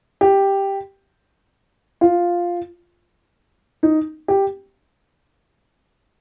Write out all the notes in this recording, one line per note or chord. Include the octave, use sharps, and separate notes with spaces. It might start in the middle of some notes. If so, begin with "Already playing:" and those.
G4
F4
D#4
G4